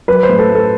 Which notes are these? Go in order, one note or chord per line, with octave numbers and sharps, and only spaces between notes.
F#3 B4
C5
A2
A4
A3
A4